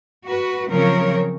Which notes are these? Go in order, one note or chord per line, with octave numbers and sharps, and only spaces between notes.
F#4 B4
C#3 F3 F#3 C4 A#4 C#5